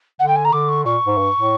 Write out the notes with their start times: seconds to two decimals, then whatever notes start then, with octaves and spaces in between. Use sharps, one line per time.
0.19 D3 F#5
0.28 G5
0.36 G#5
0.45 A#5
0.52 D3 D6
0.69 C#6
0.85 A#2 C#6
1.06 G#2
1.18 G2
1.39 A2